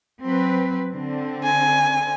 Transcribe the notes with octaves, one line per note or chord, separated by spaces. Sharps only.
F#3 C4 B4
D3 C4
G#5